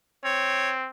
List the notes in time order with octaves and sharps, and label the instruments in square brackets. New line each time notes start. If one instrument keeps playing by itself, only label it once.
[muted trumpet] C4 [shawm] C#5